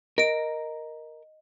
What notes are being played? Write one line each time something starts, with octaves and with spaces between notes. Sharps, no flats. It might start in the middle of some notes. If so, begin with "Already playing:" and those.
A#4 D#5 D7